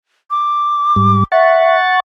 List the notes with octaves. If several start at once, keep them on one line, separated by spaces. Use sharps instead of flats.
D6
G#2 G3
E5 F#5 C#6 A6